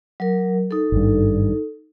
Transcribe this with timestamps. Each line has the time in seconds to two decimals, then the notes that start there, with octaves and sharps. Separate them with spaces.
0.20 F#3 A#4
0.71 D#4 A4
0.92 G#1 G2